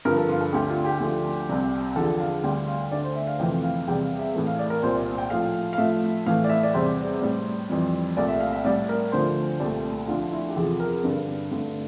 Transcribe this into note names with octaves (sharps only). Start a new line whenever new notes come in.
G2 D3 F3 A#4
A4
F4
A4
D2 D3 A3 G4
F4
G4
D2 D3 F3 A3
C2 C3 G3
E2 D3 F3 A4
F5
D2 D3 G3 G5
F5
D2 D3 A3 D5
C5
E5
F5
F2 C3 E3 A3 G5
F5
E2 C3 G3 G5
F5
E5
A2 E3 A3
F5
D5
A#4
C2 A#2 G3 C5
D5
G5
A2 F3 A3 F5
F5
A2 F3 A3 E5
A2 E3 A3 F5
D5
E5
D5
E2 C3 G3 C5
A2 G3
F2 E3 G3
C2 A#2 A3 D5
E5
F5
E5
A2 G3 D5
A#4
D2 D3 F3 A3 C5
C2 A#2 A3 D5
D2 D3 F3 A3 F4
E4
G4
E2 C3 F3 A4
A#4
G2 D3 G3 A4
G2 D3 A3